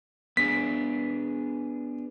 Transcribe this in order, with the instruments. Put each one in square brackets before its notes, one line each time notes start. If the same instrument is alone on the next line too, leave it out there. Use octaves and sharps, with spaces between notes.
[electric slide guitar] B3 D4 G#4 [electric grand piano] B6